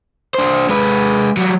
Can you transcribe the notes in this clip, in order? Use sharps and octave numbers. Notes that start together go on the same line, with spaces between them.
D4 C5
G#3 B4
F#3 G3